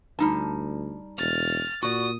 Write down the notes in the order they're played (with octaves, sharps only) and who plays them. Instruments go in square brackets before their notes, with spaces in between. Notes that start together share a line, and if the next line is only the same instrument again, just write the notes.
[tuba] D2 [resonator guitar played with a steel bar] G3 D#4 A5
[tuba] E1 [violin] F6 A6
[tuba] A#2 [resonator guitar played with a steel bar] F#4 D5 [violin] D#6